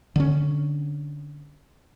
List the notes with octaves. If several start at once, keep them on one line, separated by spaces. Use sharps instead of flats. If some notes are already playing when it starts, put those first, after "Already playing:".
D3 C#4